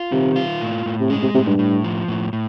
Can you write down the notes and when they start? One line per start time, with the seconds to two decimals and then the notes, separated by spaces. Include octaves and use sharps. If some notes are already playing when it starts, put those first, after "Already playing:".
Already playing: F4
0.12 C3 D#3
0.36 F4
0.61 A2
0.86 A2
1.00 C3
1.10 C#3 G#3
1.22 C3
1.34 A2 C3
1.47 G2
1.59 A2
1.84 F3
2.08 A2
2.33 A2